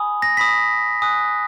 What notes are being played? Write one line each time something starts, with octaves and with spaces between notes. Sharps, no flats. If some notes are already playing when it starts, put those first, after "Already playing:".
Already playing: G#5 B5 D#6
A#6
G#5 B5 D#6 B6
G#5 D#6 F#6